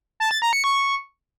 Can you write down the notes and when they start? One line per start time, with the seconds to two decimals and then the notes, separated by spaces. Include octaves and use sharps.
0.20 A5
0.31 A6
0.42 A#5
0.53 C#7
0.64 C#6